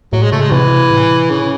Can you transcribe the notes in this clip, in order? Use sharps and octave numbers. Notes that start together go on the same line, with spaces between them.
A2 F#3
G#3
C#3 A3
G#3
C3 E3
A2
C#3